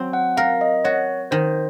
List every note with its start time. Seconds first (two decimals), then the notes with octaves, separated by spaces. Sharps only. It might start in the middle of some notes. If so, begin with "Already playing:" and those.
Already playing: F#3 C4
0.13 F#5
0.37 A#4 F5
0.61 D#5
0.84 F#4 C#5
1.31 D#3 C5